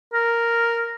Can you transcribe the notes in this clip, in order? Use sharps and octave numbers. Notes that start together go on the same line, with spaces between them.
A#4